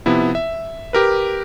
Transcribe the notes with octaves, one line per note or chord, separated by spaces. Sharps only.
C3 F3 B3 E4
E5
G4 A#4 B4